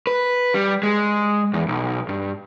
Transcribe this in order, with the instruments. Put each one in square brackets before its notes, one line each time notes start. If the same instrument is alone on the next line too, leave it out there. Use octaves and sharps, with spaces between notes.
[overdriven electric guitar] B4
G3
G#3
E2
B1
G2